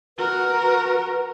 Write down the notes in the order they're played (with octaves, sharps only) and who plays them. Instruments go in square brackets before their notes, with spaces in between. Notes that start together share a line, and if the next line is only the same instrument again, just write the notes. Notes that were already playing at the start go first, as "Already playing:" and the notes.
[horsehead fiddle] F#4 A#4 [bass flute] B4